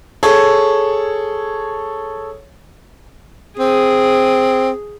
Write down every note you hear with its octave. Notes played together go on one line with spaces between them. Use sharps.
G#4 A4 C#5
C4 G#4